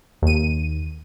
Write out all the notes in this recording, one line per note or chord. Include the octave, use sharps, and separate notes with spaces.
D#2 D#7